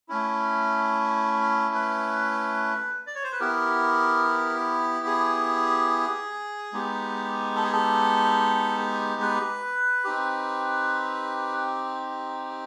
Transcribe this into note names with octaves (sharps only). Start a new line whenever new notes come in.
A3 C#4 E4
B4
D5
C#5
C5
B4
B3 E4 G4 A#4
G#4
G#3 B3 D#4 G4
A4
G#4
A4
B4
C4 D#4 G4